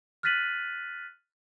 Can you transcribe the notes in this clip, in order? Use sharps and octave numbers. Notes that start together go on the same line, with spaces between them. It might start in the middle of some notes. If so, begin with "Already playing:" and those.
F6 F#6 A6 B6 D#7 F#7